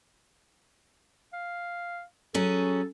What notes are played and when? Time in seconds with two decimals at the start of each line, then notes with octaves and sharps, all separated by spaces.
1.33 F5
2.34 F#3 C#4 G#4 A4